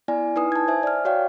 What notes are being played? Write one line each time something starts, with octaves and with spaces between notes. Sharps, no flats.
B3 E4 D5 G#5
D#4 E4 B4 G#5 D#6
A5 G#6
C5 E5 G#5
D5 F6
F#4 C#5 D5 F5 G5